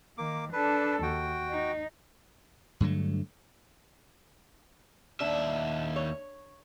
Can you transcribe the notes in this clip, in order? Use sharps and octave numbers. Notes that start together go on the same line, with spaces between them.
D#3 A#3 D6
D4 A4 B4
D#2 F#4 G5
D#4
G2 D3 F#3 A3
D#2 D4 E5
C#5